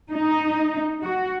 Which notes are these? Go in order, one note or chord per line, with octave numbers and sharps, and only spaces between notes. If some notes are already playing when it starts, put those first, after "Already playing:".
D#4
F#4